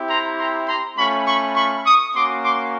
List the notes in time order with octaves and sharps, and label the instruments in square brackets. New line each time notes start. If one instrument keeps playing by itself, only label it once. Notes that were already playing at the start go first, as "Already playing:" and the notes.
Already playing: [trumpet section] C4 E4 G4
A#5 C6
A#5 C6
A#5 C6
A3 C#4 F4 B5 C#6
B5 C#6
B5 C#6
C#6 D#6
A#3 C#4 F#4 C6 D6
C6 D6